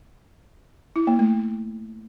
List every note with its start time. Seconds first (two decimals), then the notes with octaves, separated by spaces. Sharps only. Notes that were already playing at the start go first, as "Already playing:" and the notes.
0.96 E4
1.07 A#3
1.19 A3